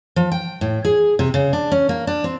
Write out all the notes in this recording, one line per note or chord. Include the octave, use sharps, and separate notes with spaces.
F3
G5
A2
G#4
C3
C#3
D4
C#4
A#3
D4
C4